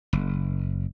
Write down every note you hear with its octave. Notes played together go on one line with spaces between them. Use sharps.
F#1